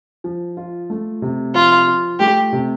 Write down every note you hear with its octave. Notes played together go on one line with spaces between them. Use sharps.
F3
F4
A3
C3
F3 F4
F4
A3 G4
C3